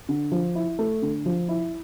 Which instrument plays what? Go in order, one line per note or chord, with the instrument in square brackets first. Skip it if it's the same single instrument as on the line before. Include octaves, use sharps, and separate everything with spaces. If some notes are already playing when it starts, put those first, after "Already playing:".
[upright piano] D3
F3
E4
A3
D3
F3
E4